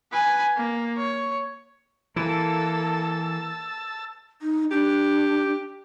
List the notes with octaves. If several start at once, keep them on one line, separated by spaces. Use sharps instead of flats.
B4 G#5
A#3
C#5
E3 A#3 A4 A5 E6
D#4
D4 G4